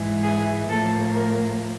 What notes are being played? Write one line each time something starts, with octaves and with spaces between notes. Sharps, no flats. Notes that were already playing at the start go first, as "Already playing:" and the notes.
Already playing: G#2 E3 G#3
G#4
A2 F3 A#3 A4
A#4